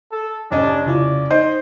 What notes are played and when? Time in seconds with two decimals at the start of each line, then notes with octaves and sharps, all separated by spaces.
0.12 A4
0.51 F1 C#4 D4 D#5
0.86 C#3 E4 F4 D5
1.30 D#4 C5 D#5